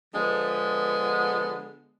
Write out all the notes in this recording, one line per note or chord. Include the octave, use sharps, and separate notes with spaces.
D3 F3 G#3 B3